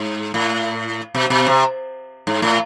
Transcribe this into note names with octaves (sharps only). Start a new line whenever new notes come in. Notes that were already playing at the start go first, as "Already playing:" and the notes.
Already playing: G#2
A2
B2
B2
C3
G#2
A2